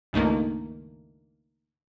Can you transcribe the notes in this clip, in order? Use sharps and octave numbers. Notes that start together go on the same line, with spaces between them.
C#2 G2 D#3 A3 A#3